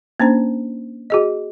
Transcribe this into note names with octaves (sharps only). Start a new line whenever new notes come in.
A#3 C#4 D4 C5 A#5
F#4 G#4 D#5